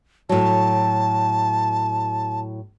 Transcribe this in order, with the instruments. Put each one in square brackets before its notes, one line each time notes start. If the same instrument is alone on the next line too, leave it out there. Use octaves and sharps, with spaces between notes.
[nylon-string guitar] A2 F#3 [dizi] A5